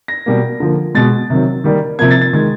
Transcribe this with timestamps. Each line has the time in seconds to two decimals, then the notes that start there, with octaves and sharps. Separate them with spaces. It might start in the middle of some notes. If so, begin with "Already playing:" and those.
0.08 A#6
0.26 B2 G3 A#3
0.60 D3 F3 A#3
0.95 B2 G#3 A6
1.30 C3 D#3 F#3
1.64 D#3 G3 A#3
1.99 C3 F3 A#3 G#6
2.11 A6
2.21 A6
2.33 D#3 G#3 G#6